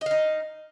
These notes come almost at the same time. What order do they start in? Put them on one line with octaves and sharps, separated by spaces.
D#5 F5 D#4